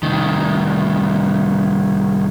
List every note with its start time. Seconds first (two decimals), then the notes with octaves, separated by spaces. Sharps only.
0.03 C2 D#3